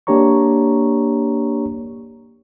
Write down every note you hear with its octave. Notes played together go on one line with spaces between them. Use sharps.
A#3 D4 G4 C#5 A#5 C#6